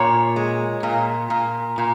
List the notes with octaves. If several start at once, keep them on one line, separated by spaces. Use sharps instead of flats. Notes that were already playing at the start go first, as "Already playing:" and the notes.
Already playing: A#2 C#5
G#3
A#2
A#2
A#2